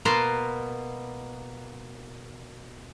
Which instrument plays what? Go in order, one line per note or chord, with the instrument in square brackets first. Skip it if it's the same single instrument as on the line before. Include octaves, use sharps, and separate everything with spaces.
[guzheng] B2 A#3 B4 A5 A#5 C6